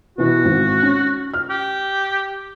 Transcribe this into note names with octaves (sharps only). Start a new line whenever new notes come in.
B2 E3 B3 F#4
G#1
C#4
F6
G4